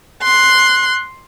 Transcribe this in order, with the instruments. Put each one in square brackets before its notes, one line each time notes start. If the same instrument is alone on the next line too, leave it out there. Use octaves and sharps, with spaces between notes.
[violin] C6 [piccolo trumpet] F#6